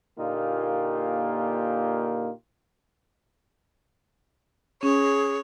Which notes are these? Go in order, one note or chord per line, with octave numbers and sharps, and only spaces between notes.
A#2 D3 A#3 D#4 F4 G4
C#4 G#4 C#5